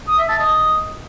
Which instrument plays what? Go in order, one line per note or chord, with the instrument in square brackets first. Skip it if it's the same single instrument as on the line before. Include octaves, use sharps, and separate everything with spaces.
[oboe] D#6
E5
A5
D#5